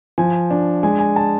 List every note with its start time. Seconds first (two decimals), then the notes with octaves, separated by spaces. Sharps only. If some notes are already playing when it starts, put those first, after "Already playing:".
0.18 F3 G#5
0.50 D4
0.83 G#3 G#5
0.99 G#5
1.16 A5